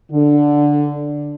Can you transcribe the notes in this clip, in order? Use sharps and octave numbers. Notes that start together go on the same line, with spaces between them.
D3